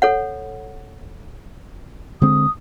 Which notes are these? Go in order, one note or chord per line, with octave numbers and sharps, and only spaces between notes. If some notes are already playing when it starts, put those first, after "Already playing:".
A4 C#5 F#5
D3 G#3 C4 D#6